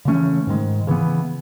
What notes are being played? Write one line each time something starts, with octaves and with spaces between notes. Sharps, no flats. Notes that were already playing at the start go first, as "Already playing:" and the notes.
C#3 E3 A3 C#4
G#2 D#3 G#3
C#3 E3 B3